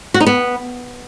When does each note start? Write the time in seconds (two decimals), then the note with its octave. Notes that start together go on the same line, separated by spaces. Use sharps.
0.14 F#4
0.20 D#4
0.27 B3